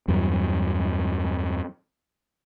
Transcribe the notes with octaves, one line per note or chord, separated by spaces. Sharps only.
E2 G2 F#3